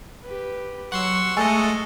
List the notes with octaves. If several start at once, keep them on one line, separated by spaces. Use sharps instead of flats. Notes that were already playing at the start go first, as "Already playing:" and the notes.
G4 B4
F#3 F#5 C6 C#6 E6
G#3 A3 A4 D#5 G#5 E6 A6